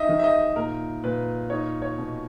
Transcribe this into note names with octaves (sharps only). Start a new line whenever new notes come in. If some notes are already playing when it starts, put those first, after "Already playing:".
Already playing: D#4 D#5 E5
D#3
E5
D#5
A#2 A#4
A#2 B4
D#4 C#5
C#5
B2